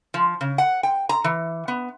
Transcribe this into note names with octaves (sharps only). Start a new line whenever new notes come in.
F3
C#3
F#5
G5
A#5
E3
B3